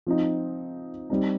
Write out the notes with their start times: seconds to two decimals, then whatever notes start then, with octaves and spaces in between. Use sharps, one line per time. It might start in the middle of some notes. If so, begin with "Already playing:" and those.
0.07 F3 C4 D#4
1.10 G3 C4 D#4